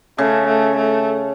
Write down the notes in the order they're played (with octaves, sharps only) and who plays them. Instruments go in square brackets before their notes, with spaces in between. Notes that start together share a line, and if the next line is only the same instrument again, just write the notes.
[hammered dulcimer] C#3 [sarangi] A3
[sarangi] A3
A3